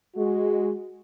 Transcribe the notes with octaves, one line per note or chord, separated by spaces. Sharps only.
G#3 F#4